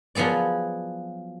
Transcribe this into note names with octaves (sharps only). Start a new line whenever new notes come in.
F3 F#3 B3 G#4 D5